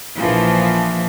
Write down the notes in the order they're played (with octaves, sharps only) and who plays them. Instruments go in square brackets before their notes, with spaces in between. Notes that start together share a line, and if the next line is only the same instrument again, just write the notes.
[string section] A#1 E3 F3